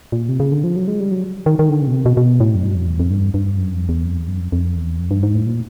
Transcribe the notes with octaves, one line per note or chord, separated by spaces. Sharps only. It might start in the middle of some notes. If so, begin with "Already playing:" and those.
A#2
C3
C#3
D3
F3
F#3
G#3
G3
F#3
D#3
D#3
D3
C#3
B2
C3
B2
B2
A2
F#2
G2
F2
E2
F2
G2
G2
F#2
F2
E2
F2
E2
F#2
F2
F2
E2
F2
G2
G#2
A2
A#2